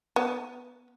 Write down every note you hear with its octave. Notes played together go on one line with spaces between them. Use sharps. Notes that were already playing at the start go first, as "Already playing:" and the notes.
B3